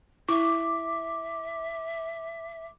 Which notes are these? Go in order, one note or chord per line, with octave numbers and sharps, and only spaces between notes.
E4 E5 D6